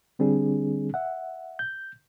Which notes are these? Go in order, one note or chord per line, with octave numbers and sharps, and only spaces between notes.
D3 G3 C4 D4 G#4
E5 F#5
G6